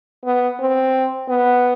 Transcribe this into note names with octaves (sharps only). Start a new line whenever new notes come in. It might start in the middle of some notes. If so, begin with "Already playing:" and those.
B3
C4
B3